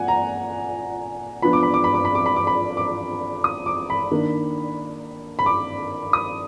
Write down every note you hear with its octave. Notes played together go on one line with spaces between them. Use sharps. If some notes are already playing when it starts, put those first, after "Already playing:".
Already playing: A#2 D5 F#5 G#5
A#5
F3 B3 D4 B5
D6
B5
D6
B5
D6
B5
D6
B5
D6
B5
D6
D#6
D6
B5
D#3 A#3 D4
B5
D6
D#6